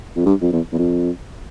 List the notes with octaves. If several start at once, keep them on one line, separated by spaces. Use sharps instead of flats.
F2
G2
F2
E2
E2
F2